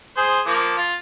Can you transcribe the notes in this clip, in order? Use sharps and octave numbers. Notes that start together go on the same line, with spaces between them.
G#4 C5
F3 A#3
F4